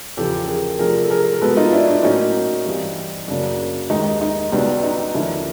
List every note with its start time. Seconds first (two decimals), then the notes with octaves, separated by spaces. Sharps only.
0.17 E2 C#3 F3 G4 A4
0.48 G#4 A#4
0.79 C3 F3 A3 D4 G#4 A#4
1.04 A4
1.10 G#4 A#4
1.33 A#4
1.41 B2 G#3 B3 A4 B4
1.57 D#4 F4
1.72 D4 E4
1.88 D4
2.03 A2 F#3 A#3 C#4 D#4
2.66 G2 E3 G3 C4
3.28 F#2 C#3 F#3 A#3 D4
3.90 D#2 D#3 G#3 D#4
4.21 D#4
4.52 C#2 B2 G3 B3 D4
4.83 D#4
5.14 D#2 D3 F3 A#3 C#4 D4 E4